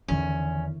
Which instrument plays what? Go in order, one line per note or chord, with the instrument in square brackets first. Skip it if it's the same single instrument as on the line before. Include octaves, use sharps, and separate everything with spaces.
[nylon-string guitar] E2 [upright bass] D3 D#3 [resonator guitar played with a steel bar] C#4